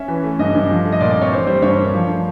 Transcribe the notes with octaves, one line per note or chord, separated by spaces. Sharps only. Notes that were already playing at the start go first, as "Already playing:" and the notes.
Already playing: C#4 E5
E3
A3
G2 D#5
G2
F3
A3
D#5
A#2 D5
D5
C4
C#5
E3 C5
G3 C5
G2 C#5
A#3
F3
A3